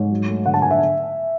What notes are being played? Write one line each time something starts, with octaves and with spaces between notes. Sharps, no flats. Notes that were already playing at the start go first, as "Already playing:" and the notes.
Already playing: G#2 C#5
F#3
A3
D3 F#5
A5
D3 G#5
E5